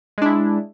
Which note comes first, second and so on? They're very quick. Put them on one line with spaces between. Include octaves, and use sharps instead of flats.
G#3 D4 E4